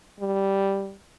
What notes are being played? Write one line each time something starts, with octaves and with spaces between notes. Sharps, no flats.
G3